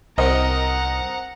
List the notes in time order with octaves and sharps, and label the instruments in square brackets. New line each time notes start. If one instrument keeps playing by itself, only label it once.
[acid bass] C2 [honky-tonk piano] C4 A#4 D#5 [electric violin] F#5 A#5